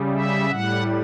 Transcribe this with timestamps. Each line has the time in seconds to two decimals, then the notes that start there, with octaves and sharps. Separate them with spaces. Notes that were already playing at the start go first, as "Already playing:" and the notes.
Already playing: C#3 G3
0.13 E5
0.49 A2 G3 F#5